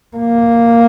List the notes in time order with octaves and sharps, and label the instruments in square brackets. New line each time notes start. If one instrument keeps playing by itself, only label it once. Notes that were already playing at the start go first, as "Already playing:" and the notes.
[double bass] A#3